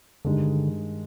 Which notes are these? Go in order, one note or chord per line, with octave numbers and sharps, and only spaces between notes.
G2 D3 D#3 G#3 D#4 G4